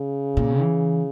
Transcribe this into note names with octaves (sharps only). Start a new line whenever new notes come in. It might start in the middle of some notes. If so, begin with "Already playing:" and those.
Already playing: C#3
A#2
E3